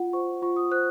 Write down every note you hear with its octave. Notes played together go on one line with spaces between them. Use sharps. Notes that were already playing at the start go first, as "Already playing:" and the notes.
Already playing: F4 F#5
C5 C#6
F4 C#6
D#6
C5 F#6